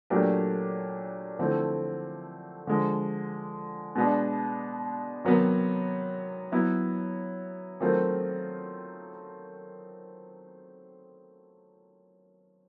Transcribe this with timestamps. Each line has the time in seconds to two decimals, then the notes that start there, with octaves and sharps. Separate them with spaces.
0.10 A#2 F#3 A3 D4 G4
1.39 D3 F3 A3 C4 E4
2.67 D3 F3 G#3
3.95 B2 G#3 B3 D4
5.25 C3 D#3 F#3 B3
6.52 F#3 B3 E4
7.80 D#3 F#3 A3 C4 F4